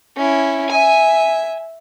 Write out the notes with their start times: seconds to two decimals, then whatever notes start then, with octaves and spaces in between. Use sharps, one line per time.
0.17 C#4 E4
0.70 E5 G#5